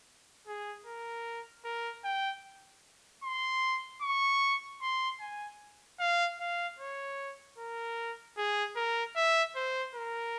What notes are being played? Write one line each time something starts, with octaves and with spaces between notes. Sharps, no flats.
G#4
A#4
A#4
G5
C6
C#6
C6
G#5
F5
F5
C#5
A#4
G#4
A#4
E5
C5
A#4